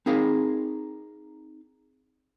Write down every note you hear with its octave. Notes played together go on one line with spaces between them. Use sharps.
C4 D#4 G#4 A#4 F5